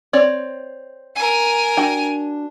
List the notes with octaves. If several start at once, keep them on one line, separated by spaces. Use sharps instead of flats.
C4 C#5 D5
A#4 G#5
D4 F#4 G5